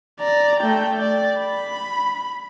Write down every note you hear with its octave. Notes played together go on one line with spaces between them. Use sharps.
D5 A#5
A3 G5
D5
B5